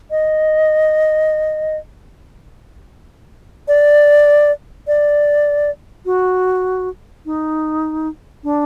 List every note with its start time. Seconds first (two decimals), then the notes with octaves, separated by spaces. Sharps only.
0.11 D#5
3.68 D5
4.87 D5
6.06 F#4
7.26 D#4
8.44 D4